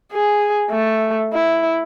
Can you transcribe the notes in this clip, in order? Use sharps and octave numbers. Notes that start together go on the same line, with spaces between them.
G#4
A3
E4